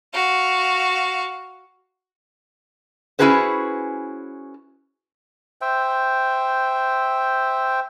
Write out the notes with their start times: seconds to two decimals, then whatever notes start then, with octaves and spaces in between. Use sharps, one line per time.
0.13 F#4 F5
3.19 C#4 E4 F#4 G#4 B4 C5
5.61 C5 E5 G5